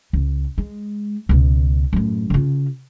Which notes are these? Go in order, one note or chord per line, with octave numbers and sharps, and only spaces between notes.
C#2
G#3
C#2 B2
F#2 A2
C#3 F4